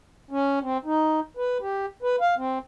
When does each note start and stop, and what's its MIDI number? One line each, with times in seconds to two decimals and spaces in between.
0.31 0.59 61
0.62 0.78 60
0.85 1.20 63
1.37 1.58 71
1.61 1.86 67
2.02 2.16 71
2.21 2.35 77
2.37 2.59 60